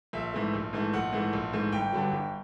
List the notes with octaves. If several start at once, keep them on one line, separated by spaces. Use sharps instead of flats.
A#1 E5
G#2 E3 A3
A#1
G#2 E3 A3
A#1 F#5
G#2 E3 A3
A#1
G#2 E3 A3
G1 G5
G2 D3 F#3
G1